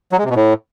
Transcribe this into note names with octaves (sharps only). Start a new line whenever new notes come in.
F#3
G#3
C3
B2
A2